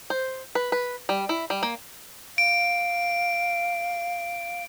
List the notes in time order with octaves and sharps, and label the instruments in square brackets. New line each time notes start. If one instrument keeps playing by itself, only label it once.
[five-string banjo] C5
B4
B4
G3
E4
G3
A#3
[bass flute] F5 [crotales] D7